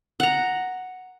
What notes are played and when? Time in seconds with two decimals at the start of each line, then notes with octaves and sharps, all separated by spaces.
0.20 F#5 A#5